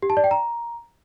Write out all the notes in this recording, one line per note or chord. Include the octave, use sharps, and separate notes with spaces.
G4
A5
D5
G5
A#5